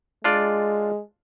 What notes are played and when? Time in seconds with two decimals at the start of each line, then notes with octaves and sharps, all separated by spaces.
0.24 G#3 D4 F4 D5